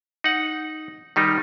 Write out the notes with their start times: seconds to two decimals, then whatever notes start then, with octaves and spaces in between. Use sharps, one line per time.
0.24 D#4 F#5
1.16 D#3 G3 D#4